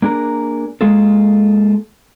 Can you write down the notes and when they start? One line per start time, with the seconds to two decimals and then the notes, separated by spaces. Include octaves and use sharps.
0.02 A#3 D4 G#4 A#4
0.81 G#3 A#3 F4 G#4 A4